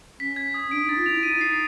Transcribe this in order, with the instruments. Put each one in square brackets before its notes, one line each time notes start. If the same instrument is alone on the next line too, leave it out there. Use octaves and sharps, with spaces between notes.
[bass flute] C#4 [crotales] B6
[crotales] G#6
D#6
[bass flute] D4 [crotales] D7
[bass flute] D#4 [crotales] A6
[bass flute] F4
[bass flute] E4 [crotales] F7
[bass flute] D#4 [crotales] D#7
[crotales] C7